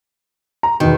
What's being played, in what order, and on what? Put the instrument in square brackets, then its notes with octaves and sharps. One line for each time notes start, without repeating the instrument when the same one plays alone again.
[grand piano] A#5
[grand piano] E2 B2 [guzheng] D#3